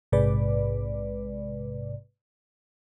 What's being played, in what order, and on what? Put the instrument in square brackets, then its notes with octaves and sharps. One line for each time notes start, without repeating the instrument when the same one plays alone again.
[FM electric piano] A#1 G#2 C3 G#3 B4 D5